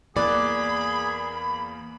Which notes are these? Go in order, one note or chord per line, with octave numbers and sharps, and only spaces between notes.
E2 A#3 G#4 D5 B5 F#6